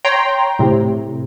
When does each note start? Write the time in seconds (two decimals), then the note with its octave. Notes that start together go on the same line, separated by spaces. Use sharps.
0.05 C#5 G5 A#5 C6
0.59 A2 C3